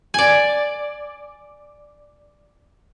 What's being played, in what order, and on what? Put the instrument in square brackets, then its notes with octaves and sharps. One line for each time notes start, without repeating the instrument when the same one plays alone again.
[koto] D5 G#5